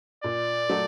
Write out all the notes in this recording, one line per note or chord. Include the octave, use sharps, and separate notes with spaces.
A#2 D5
F#3 A3